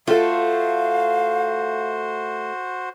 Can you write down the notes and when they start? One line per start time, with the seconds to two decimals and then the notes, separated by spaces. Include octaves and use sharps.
0.08 A3 F4 F#4 A4 C5 F5